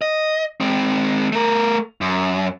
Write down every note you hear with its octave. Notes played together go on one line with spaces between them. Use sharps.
D#5
G#3 C4
A3 A#4
F#2